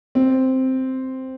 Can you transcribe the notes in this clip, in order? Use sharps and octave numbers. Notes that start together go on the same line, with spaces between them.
C4